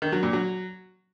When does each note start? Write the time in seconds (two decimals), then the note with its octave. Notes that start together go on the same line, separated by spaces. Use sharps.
0.02 D#3
0.12 F#3
0.23 A#2
0.33 F#3